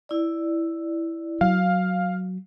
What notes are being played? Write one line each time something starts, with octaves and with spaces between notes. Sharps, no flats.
E4 D5
F#3 F5